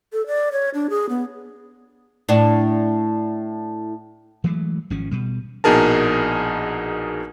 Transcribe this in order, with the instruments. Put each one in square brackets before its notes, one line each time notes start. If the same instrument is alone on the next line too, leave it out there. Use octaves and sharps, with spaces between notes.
[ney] A4
D5
C#5
D4
G#4
B3
[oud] A2 D4
[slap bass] E3 F#3 G#3 A3
G#1 F3 C#4
B2 G3
[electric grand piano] A#1 B2 D#4 G#4 A#4 A5